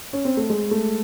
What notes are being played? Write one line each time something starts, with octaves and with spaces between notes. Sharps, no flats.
C#4
C4
A3
G#3
A3